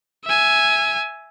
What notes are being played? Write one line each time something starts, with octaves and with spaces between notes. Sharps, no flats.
E5 G#5